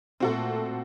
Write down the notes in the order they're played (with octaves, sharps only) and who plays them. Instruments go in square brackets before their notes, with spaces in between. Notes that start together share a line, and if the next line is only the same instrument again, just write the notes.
[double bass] A#2 A3 [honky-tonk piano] C4 F#4 A4